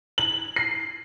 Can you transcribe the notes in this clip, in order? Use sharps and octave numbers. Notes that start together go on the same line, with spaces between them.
F#7
C7